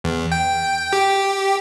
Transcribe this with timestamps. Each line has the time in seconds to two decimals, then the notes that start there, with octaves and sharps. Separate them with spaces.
0.04 E2
0.32 G5
0.93 G4